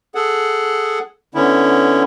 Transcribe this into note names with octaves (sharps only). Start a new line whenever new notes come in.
G#4 A4 F#5
D3 B3 C#4 E4